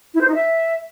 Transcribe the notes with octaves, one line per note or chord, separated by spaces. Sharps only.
E4
C5
D#4
E5